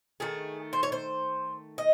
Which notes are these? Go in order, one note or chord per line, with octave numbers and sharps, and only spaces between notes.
D#3 A3 G#4
C5
C#5
C5
D#5